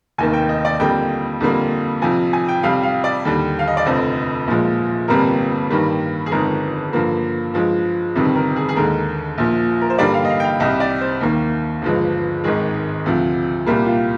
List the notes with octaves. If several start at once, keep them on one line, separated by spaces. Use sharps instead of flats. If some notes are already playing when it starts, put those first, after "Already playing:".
F1 D#2 D#3 A#3 G#5
G5
D#5
D5
F2 D3 G3 A#3 G5
F2 D3 G3 A#3
F2 C3 F3 G#5
G#5
G5
F2 C3 G3 F5
F5
D5
D#2 D3 G3
F5
D#5
D5
F1 F2 D3 C5
A#1 A#2 F3 G#3
G1 F2 C3 G3 A#3 A#4
G2 D#3 G3 A#3
G#4
G1 F2 D#3 G#3 A#4
G2 D3 F3 A#3
G2 F3 G#3
G1 F2 C3 D#3 G3
A#4
G#4
G#4
D#2 D3 G#3 A#4
A#1 A#2 F3
A#4
C5
G2 D3 G3 A#3 D5
F5
D#5
F5
G5
F5
C2 C3 G3 D#5
D5
C5
D#2 D#3 A#3
G1 G2 F3 G#3
G#1 G#2 D#3 G#3 G#4
D2 C3 F3
C2 A#2 G3 A#3
F4